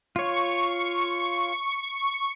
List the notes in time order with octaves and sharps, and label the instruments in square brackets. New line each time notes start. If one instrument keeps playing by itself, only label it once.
[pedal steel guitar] F4 C#5 [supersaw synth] C#6